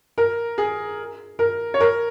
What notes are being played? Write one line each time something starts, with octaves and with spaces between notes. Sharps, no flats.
A#4
G#4
A#4
C#5
A#4